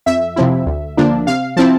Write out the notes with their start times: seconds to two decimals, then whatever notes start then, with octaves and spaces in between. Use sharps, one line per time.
0.06 F2 E5
0.36 C3 F3 C4 E4
0.66 D2
0.97 D3 F3 A#3 D4
1.27 C3 F5
1.56 F3 C4 E4 A5